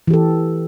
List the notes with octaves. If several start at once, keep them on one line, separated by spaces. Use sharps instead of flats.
E3 G4 A4